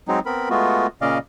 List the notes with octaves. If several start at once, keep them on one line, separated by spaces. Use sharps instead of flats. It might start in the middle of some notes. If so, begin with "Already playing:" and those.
F#3 G#3 C4 D#4
B3 C4 A#4 B5
G#3 A3 B3 F4 F#4
A#2 C#3 C#4 D5 D#5 F5